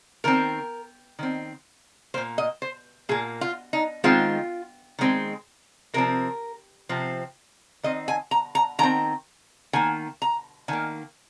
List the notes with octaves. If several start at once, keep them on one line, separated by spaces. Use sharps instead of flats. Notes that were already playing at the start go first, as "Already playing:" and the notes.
D#3 C4 A#4
D#3 C4
A#2 A#3 C5
D#5
C5
A#2 A#3 G#4
F4
D#4
D#3 G#3 C4 F4
D#3 G#3 C4
C3 F3 C4 A#4
C3 F3 C4
D#3 C4 D#5
G#5
A#5
A#5
D#3 C4 A#5
D#3 A#3 G#5
A#5
D#3 A#3 G#5